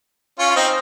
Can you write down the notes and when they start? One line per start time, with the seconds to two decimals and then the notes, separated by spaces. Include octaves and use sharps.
0.39 C#4 F4
0.50 F4
0.55 C4 D#4